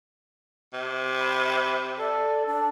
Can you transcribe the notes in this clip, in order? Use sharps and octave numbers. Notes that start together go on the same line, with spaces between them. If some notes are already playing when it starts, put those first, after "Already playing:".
C3
B5
A4 D5
D4